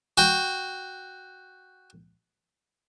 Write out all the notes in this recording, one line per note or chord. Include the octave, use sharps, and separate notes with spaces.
F#4 G5